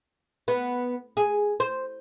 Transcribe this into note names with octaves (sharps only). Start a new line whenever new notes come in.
B3
G#4
C5